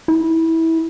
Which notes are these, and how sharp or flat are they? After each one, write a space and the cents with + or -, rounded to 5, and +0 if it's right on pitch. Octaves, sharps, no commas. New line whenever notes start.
E4 -20